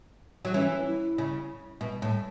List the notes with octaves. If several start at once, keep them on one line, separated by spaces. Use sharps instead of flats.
F#3
E3 C#4
E4
C#3
B2
A2